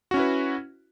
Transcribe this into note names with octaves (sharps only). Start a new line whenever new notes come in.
C#4 E4 F#4 B4